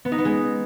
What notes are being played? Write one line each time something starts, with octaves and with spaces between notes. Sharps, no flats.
B3
D#4
B3
G#3